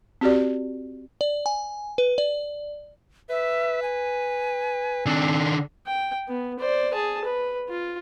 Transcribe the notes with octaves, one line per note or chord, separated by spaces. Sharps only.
C4 F#4 G4 D5
D5
G#5
B4
D5
B4 E5
G#5
D#3 C4 D4
G5
B3
C5 D5
G#4 A5
B4
F4